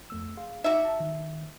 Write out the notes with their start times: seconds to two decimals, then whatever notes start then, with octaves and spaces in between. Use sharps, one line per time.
0.10 F2 A3 E6
0.37 G#4 F5 C6
0.64 D#4 F#4 E5 A#5 D6
0.85 A5
1.00 D#3